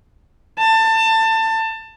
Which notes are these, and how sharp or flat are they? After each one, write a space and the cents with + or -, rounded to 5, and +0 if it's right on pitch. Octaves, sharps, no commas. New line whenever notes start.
A5 +25